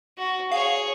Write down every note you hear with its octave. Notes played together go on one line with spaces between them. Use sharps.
F#4
G#4 C#5 F5